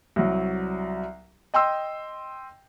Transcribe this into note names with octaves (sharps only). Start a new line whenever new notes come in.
C2 F#3
D#5 G5 C6 E6